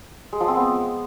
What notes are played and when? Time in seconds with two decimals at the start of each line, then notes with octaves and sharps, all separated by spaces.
0.33 G#3
0.40 F3
0.48 C4
0.56 B3